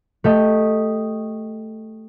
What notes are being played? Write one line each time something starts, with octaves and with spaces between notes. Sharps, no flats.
A3 G4 D#5